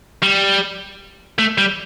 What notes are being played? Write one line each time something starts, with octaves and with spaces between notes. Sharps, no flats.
G3
A3
G3